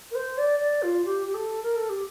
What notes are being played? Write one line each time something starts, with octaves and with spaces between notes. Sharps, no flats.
A#4
C5
D5
D5
F4
G4
G4
A4
A#4
A4
G4